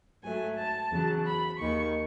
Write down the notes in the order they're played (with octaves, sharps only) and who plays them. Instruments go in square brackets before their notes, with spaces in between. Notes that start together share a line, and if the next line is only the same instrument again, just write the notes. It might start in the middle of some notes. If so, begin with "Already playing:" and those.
[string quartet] G#2 F#3 A3 G#5
A5
E2 C#3 F#3
B5
D#2 D#3 G#3 C#6